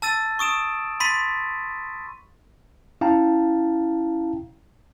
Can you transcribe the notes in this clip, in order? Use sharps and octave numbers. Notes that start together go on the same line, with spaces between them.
A5 E6 A6 D#7
C#6 D#6 D7 E7
B5 C6 A6 B6 D#7
C#4 E4 F5 G5 A5 A#5